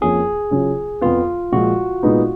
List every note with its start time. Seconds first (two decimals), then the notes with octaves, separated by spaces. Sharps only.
0.01 F2 F3 A#3 C#4 F4 G#4
0.51 C#3 F#3 C#4 F4
1.01 F2 F3 B3 F4
1.52 A#2 F3 G#3 F#4
2.03 A#2 G#3 B3 D#4